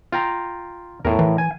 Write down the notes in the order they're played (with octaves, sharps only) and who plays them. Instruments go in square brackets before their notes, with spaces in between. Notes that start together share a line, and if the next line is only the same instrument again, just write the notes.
[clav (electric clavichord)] F4 G5 A#5
[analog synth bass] E2 [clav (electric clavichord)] A2 A#4
[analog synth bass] E3
[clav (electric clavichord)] G#5